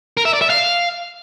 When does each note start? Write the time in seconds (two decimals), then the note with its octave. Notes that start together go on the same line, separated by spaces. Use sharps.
0.17 A#4
0.25 E5
0.33 D5
0.42 E5
0.50 F5